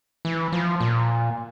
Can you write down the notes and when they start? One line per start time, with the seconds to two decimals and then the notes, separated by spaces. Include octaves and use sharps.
0.25 E3
0.52 F3
0.80 A#2